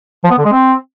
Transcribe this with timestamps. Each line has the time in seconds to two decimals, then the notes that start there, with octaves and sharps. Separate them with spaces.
0.24 F3
0.31 B3
0.38 D3
0.45 G#3
0.52 C4